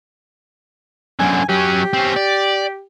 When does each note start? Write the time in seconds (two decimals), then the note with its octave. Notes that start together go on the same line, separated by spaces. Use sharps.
1.19 F#2 D3 G#5
1.49 F#3 C#4 G4
1.93 C4 C#4
2.16 D5